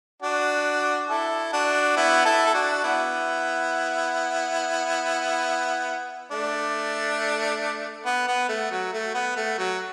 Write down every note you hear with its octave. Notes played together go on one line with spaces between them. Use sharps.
D4 F#4
E4 A4
D4 F#4
B3 E4
E4 A4
A4
D4 F#4
B3 E4
A3 D4
B3
B3
A3
F#3
A3
B3
A3
F#3